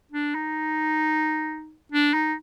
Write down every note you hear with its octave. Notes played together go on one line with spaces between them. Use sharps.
D4
D#4
D4
D#4